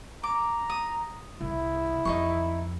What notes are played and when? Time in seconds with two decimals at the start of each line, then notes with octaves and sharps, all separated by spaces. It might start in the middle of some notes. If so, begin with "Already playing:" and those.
0.23 A#5 D6
0.70 D#6
1.41 C2 E4
2.05 F2 D#4 G#4 C#6